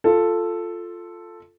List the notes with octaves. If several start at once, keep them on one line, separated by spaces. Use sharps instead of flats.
F4 A4